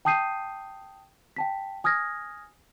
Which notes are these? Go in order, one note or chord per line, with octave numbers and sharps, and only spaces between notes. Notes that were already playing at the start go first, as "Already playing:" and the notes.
G5 A5 D#6 G6 C7 D#7
G5 A5 B6
G#5 D#6 F6 G#6 A#6